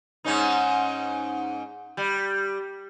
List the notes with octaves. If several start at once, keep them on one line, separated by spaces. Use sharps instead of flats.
G#2 C#4 D#4
G3